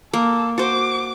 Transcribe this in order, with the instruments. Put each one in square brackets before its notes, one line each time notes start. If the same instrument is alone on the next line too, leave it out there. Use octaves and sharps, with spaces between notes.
[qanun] A#3 [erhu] A4
[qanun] F#4 C5 [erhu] D6